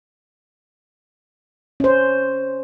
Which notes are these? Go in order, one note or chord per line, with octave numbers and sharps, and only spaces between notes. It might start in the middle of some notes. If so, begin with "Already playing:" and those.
C#4 C5